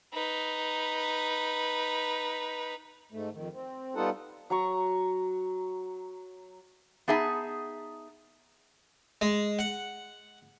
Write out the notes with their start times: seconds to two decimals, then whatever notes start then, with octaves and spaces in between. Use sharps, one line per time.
0.14 D#4 B4
3.12 G#2 A3
3.33 F2 D#3
3.53 C4
3.95 G3 B3 D#4 F4 A4 F#5
4.50 F#3 A#5 C#6
7.08 B3 D#4 G#4 E5 G#5 A5
9.21 G#3
9.59 F#5